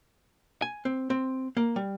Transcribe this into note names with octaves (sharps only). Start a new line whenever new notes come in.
G#5
C4
C4
A#3
G3